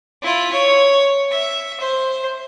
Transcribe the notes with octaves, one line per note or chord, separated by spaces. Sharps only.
E4 F4
C#5
E5
C5